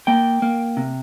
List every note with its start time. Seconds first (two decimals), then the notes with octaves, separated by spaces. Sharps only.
0.07 A#3 G5
0.42 A#3
0.77 C3